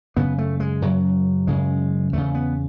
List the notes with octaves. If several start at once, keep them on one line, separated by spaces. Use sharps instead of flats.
F#2 C#3 B3
A3
G#3
F#2 C#3 F#3
F#2 C#3 G#3
E2 C#3 A3
B3